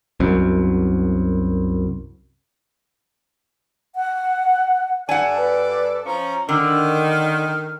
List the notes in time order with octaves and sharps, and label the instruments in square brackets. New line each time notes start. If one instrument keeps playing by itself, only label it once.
[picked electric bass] C2 F#2
[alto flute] F#5
[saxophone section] G2 A4 D5 [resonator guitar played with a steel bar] F#5 G#5 [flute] A5
[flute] B4
[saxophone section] F3 C#4 [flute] A#5
[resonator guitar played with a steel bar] D3 [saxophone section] D#3 [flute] F6